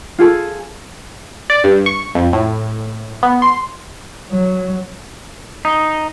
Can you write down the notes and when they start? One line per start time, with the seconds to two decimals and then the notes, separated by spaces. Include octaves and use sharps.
0.19 F4 G#4 A4
1.50 D5
1.64 G2
1.86 C#6
2.15 F2
2.33 A2
3.23 B3
3.42 C6
4.31 F#3
5.65 D#4